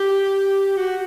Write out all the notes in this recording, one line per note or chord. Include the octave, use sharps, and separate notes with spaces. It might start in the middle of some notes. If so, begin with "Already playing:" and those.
Already playing: G4
F#4